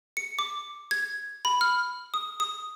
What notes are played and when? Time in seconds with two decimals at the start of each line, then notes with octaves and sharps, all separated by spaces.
0.17 C#7
0.39 D6
0.91 G#6
1.45 B5
1.61 F6
2.14 D#6
2.40 D#6